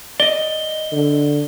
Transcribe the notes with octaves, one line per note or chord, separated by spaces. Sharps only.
D5 D#5 G7
D3